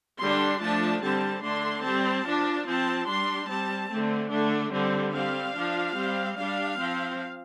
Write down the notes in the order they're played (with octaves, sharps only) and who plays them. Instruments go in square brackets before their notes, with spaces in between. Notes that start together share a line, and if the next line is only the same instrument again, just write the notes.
[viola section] D3 G3 D4 C6
F3 A3 D4 A5
D3 G3 C4 A5
D3 A3 D4 C6
G3 C4 A5
F3 D4
F3 C4 A5
G3 D4 C6
G3 C4 A5
D3 A3 C4
D3 A3 D4
D3 G3 C4
G3 C4 F5
F3 D4
G3 C4
G3 D4 F5
F3 C4